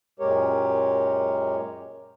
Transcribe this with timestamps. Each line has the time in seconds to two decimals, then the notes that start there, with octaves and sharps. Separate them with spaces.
0.19 F#2 A#2 G#3 G4 A#4 C#5